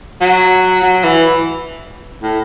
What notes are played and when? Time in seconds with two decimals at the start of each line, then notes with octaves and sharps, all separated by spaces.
0.21 F#3
0.83 F#3
1.04 E3
2.22 A2